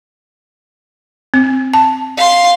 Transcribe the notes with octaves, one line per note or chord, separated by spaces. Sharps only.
C4
A5
F5 C6